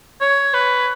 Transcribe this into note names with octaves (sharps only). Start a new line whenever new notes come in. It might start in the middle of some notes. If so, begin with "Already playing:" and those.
C#5
B4